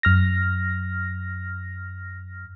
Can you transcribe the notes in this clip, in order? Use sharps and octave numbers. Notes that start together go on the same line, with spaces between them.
F#2 F6 A#6